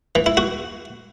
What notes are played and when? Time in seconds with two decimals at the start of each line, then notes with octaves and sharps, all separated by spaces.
0.15 E3
0.26 E4
0.37 F#4